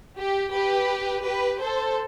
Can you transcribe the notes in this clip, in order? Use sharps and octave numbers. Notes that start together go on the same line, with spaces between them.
G4
G4 B4
G4 B4
A4 C5